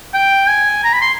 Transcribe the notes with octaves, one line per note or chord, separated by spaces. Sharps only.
G5
G#5
A#5
B5
C6